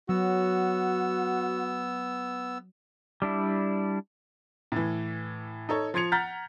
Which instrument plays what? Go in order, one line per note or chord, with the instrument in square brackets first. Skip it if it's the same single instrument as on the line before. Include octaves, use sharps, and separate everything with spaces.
[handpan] F#3 [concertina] B3 E6 [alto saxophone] F#4
[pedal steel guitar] G3 D4 E4
[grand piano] A2 E3
D#4 A4 C#5
F3 C6 G#6 C#7 F7
F#5 A#5 F6 G6 A6 B6